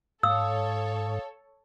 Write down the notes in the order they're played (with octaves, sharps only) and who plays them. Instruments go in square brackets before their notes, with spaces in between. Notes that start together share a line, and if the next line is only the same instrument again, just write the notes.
[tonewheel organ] G#2 [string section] A4 C#5 [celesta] F5 D#6 [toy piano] E6